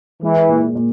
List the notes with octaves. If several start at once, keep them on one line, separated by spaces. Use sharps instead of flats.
E3 G#3
A#2
A#2